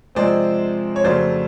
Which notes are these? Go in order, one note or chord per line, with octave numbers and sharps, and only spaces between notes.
C3 F3 G#3 C4 C5 D5
C#5
F2 C#3 F#3 A3 C5 D5